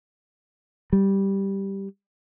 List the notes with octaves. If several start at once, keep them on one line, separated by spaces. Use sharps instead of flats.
G3